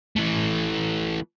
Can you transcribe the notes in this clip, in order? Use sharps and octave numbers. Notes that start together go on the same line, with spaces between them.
E3 A3